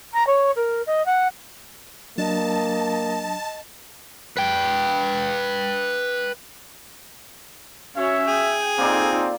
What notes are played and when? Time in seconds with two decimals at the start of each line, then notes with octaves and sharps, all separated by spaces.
0.13 A#5
0.27 C#5
0.56 A#4
0.86 D#5
1.06 F#5
2.18 F#3 A#3 D4 D#5 A5
4.37 B4 G5
7.96 C#4 F#4 C#5 E5
8.27 G#4 G5
8.78 A#3 C4 D#4 F4 A4 D5